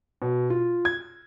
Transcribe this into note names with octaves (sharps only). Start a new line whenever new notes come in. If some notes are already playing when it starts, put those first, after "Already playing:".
B2
F4
G#6